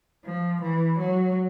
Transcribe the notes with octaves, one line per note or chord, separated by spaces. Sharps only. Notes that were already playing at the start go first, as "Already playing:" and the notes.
F3
E3
F#3